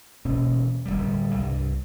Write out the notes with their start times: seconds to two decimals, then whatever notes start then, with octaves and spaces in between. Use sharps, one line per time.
0.25 E1 B2 A#3 C#4
0.86 D1 G#1 G3
1.35 C2 G2